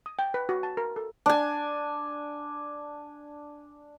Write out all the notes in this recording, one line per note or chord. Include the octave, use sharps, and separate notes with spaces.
D#6
G5
B4
F#4
A5
A#4
A4
D4 G#5